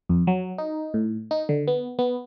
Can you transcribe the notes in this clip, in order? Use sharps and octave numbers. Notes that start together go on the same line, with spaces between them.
F2
F#3
D#4
A2
D#4
D3
B3
B3